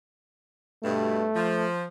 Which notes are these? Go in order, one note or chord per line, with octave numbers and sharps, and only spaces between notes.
G2 B2 A3
F3